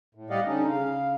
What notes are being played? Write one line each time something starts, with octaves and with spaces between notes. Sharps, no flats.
A2
G3 G4 D5 D#5 F5 F#5
D3 C#4 D#4
C#3 F5